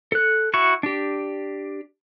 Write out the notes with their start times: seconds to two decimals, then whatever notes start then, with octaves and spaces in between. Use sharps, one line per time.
0.12 A4 F#6
0.54 E4 F#4 C#6
0.83 D4 G4